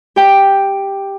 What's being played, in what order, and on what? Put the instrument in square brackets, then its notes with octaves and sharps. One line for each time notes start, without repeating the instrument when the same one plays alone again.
[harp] G4 G5